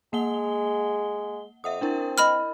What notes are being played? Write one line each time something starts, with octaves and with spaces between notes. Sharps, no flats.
G#3 A#3 F#5 G7
F2 E5 F#5 D#6
C4 D4 E4 A#4
D#5 B5 F6